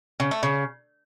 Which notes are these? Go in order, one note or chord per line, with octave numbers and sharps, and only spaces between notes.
C#3
A3
C#3